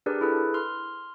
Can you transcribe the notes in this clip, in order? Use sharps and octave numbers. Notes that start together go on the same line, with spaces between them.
D4 G4 G#4 A#4 B4 D5
E4 G#4 A4 B4
C6 F6